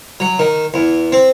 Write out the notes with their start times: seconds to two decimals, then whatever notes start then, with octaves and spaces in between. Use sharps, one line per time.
0.20 F#3
0.39 D#3
0.74 E2
1.12 C4